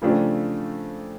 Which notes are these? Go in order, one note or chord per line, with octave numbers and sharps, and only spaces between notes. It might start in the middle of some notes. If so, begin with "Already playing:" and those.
C#3 F3 A3 D4 G4